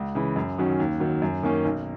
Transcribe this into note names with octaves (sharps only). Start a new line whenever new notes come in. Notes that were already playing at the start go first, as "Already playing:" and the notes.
Already playing: C#2
C#3 E3
F#2
D#3 F#3 C#4
D#2
D#3 F#3
F#2
D#3 A#3 C#4
B1